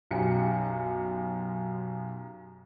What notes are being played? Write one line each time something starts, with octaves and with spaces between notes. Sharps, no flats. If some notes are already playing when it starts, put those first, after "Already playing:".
B1 F#2 G4 C#7